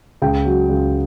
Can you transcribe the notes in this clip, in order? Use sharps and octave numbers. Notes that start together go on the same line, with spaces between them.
C#2 G5
F#3
C#2